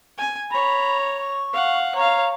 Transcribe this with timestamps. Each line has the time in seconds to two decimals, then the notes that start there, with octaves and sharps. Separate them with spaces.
0.18 G#5
0.51 C#5 A#5 B5
1.18 C#6
1.53 F5 F#5
1.95 C#5 F5 A#5